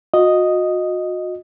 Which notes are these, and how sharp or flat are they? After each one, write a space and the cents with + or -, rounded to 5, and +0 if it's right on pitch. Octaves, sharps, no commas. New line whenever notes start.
F#4 -35 D#5 +0